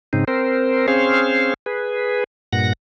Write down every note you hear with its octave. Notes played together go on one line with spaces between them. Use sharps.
G#2 C#3 C4 D#4
C4 A#4 C5
C4 C#4 G#4 C5 F5
G#4 B4
G2 A#2 F#5 A#6